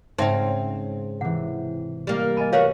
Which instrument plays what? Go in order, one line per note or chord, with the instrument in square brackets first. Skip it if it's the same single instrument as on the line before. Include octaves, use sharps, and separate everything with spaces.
[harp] G#2 C#3 [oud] C4 C#4 [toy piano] D#4 E5 G5
[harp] C3 E3 [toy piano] F#5
[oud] G3 A#3
[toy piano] D#5 G#5 B5 [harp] F6 D#7
[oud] F#4 A#4 E5 [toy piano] B4 C#5 F5 [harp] D#7